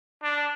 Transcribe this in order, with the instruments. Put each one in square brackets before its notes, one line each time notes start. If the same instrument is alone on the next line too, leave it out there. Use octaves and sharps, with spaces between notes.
[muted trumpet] D4